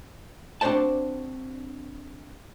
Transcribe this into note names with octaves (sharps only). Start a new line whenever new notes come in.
C4 D4 F#4 C5 D5 A5